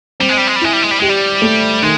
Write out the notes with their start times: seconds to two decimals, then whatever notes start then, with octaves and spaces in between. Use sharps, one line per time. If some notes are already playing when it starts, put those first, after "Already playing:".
0.20 G3 C4
0.29 G#3
0.37 G3
0.47 G#3
0.56 G3
0.61 G#3 E4
0.73 G3
0.82 G#3
0.91 G3
1.00 G#3 G4
1.09 G3
1.42 A3
1.82 D#3 G#3